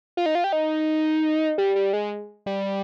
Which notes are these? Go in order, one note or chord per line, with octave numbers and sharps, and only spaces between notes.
F4
D#4
F4
G4
D#4
G3
G3
G#3
G3